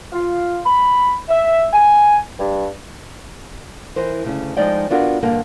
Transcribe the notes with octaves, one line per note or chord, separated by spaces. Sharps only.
F4
B5
E5
G#5
G2
E3 A#4 C5
D2 C#3
F3 G#3 D#4 D5 G5
B3 D4 F4 F#4 A#4
E2 G2 D3 A#3